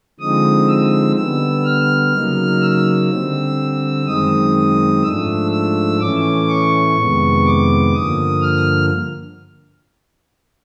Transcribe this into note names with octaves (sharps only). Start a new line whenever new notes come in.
D3 F3 G#3 C4 D#4 D#6
E6
D3 G3 B3 E6
F6
C#3 F#3 A#3 D#4
E6
D3 G3 C4
F#2 D#3 G#3 C4 D#4 D#6
G#2 F3 A3 D4 E6
E6
A2 E3 A3 C#4 D6
C#6
F2 C3 D#3 G#3 B3
D6
G2 D3 F3 A#3 D#6
F6